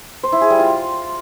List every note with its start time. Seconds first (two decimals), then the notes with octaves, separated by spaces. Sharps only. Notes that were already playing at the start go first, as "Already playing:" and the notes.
0.23 C5
0.32 E4
0.41 G#4
0.50 G3
0.59 F4